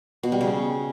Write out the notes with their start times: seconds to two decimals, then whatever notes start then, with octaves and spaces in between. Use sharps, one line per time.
0.23 B2
0.32 G3
0.41 C#3